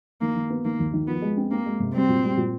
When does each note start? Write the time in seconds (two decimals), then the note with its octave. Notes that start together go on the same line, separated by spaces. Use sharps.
0.21 D#3 A#3
0.35 D#3
0.50 B3
0.65 D#3 A#3
0.79 D#2
0.93 D#3
1.07 F3 B3
1.22 G#3
1.37 C4
1.51 A#3 C4
1.66 G#3
1.80 C3
1.94 G3 C4
2.09 A#2
2.23 G3
2.37 A#2